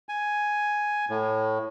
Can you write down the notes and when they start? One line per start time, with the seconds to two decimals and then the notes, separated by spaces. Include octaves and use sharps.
0.09 G#5
1.10 A2